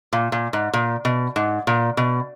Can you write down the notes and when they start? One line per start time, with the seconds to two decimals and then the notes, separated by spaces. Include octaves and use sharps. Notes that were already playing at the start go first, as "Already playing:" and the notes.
0.13 A#2
0.32 A#2
0.53 G#2
0.74 A#2
1.05 B2
1.36 G#2
1.67 A#2
1.97 B2